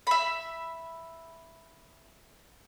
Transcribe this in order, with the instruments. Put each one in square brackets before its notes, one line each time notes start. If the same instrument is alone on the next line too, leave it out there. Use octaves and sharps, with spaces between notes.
[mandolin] E5 B5